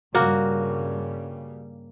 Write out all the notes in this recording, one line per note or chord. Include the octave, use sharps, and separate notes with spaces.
G2 C#3 G3 A#3 F#4